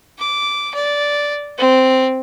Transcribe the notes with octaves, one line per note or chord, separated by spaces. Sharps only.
D6
D5
C4